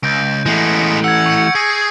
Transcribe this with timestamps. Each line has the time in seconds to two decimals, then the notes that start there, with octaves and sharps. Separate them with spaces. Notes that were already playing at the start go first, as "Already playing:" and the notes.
0.03 C#2 G6 A#6 D7
0.46 E3 G#3 A3 B3
1.04 F#5 E6 G#6
1.26 C#6 C#7
1.55 G#4 A#6 C7 C#7